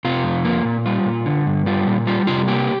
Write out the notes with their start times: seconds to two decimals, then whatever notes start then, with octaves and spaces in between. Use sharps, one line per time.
0.05 C3 F4
0.24 F2
0.45 A#3
0.65 A#2
0.86 G3 F4
1.06 A#2
1.26 D3
1.47 G2
1.66 G3 F4
1.87 A#2
2.07 G3 F4
2.27 C3 F4
2.48 A#3 G4